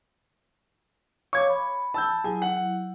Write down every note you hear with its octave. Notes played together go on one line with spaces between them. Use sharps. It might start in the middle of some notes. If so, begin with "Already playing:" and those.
C#5 F5 C#6 D6 G#6
B5
A5 E6 G6
F#3 E4 G#4
F#5